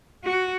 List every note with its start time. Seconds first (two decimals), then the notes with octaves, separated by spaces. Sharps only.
0.25 F#4